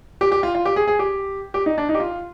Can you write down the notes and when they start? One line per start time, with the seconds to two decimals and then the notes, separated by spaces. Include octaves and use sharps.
0.21 G4
0.32 G4
0.43 F4
0.55 F4
0.65 G4
0.76 G#4
0.87 G#4
0.99 G4
1.54 G4
1.66 D#4
1.78 D4
1.89 D#4
1.95 G4
2.00 F4